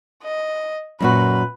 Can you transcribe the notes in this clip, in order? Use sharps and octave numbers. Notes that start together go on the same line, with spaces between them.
D#5
F#2 A#2 F#4 B4